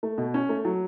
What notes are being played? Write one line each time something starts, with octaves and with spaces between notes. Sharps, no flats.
A3
B2
C#4
A3
F#3